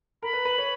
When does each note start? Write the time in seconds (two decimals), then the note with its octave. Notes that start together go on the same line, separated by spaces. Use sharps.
0.23 A#4 B5
0.33 B4
0.45 B4
0.58 C#5